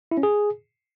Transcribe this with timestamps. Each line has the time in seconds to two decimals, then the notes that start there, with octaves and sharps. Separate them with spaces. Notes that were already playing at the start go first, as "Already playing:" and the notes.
0.11 E4
0.17 C#4
0.23 G#4